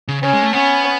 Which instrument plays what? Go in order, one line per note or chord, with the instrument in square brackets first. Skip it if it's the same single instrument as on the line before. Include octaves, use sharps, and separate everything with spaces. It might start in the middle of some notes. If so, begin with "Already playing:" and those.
[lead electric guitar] C#3
[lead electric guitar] C#3 [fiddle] C#4
[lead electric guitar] G#3
A3
[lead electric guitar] B3 [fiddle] C#4